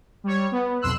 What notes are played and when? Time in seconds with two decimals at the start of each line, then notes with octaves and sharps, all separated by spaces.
0.24 G3 C#5
0.52 B3
0.81 B1 F2 C6 E6 F#6